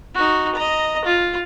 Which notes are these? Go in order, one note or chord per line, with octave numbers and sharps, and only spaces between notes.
D#4 F#4
D#5 A#5
F4